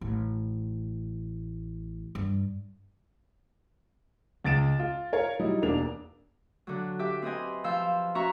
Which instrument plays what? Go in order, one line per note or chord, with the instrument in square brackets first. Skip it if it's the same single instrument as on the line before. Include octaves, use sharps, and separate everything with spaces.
[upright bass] A1
G2
[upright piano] C#2 A6 D7 E7
F4
A#4 C#5 F5
F#3 G3 D#4 E4
E1 A#3 D4 F7
[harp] D3 F#3
G4 E5 D6
C4 B4 D#5 G#5
F3 F5 E6 G6
C#4 F#4 E5 A#5 C#6